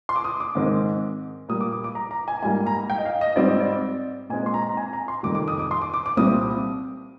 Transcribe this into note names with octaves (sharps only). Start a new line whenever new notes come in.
C6
D6
D#6
D6
G#2 D#3 G#3 C4
A#2 G3 A#3 D#6
D6
D6
D6
A#5
A#5
G#5
G#2 G3 A#3 G#5
A#5
G5
D#5
F5
D#5
G#2 G3 C4 D5
D#5
D5
A#2 G#3 C4 G#5
C6
A#5
A#5
G#5
A#5
C6
F2 C3 D#3 G3 D6
D6
D#6
D6
C6
D6
D6
D6
C2 A#2 G3 C4 D#6